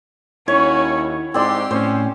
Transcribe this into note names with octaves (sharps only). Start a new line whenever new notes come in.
D#2 C#4 E4 F#4 C#5
G#2 C4 G4 D5 C6 E6
A2 C#4 C5